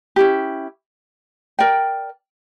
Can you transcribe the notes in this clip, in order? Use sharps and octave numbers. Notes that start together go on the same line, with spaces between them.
C#4 E4 G4
A#4 D5 G5